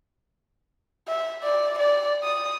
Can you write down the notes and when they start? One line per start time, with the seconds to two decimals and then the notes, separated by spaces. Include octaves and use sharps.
1.08 E5
1.44 D5
1.79 D5
2.24 D#6